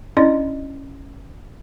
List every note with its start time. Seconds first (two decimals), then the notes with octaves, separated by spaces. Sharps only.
0.17 C#4 D4 E4 D5 D#5 C6